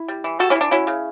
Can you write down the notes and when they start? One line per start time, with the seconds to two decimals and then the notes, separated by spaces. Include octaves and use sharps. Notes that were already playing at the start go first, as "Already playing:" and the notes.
Already playing: E4
0.08 G3
0.24 E3
0.39 G3 F#4 A4
0.50 C#4 E4
0.56 E3
0.61 D4
0.71 F#3 C#4 E4
0.87 C#3